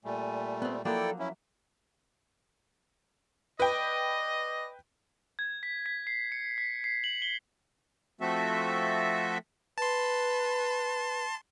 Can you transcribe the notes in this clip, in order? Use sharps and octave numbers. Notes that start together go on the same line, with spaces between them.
A#2 G3 A3 G#5
B3 C4
F3 F#3 A#3 E4 A4 D5 G5
C#4 E4 E5
B4 D5 D#5 G5
G#6
B6
B6
C7
C#7
B6
C7
F#7
G7
F3 A3 C4 F#4 A4 E5
B4 A5 C6